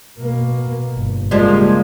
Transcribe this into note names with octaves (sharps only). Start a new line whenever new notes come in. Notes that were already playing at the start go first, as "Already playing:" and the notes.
B2 A#3
G1
C#3 F3 G3 G#3 A#3